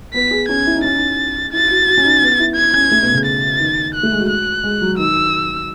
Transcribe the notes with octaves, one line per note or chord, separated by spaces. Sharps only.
B3 B6
G#4
C#4 G#6
E4
D#4
C#4 A6
D#4
E4 A6
F#4
F#4
C#4
D#4
B3
E4
G#6
C#4
A3
B2
C#3
A6
D#3
F#6
A3
G#3
F#4
F#6
G#3
F#3
D#3 E6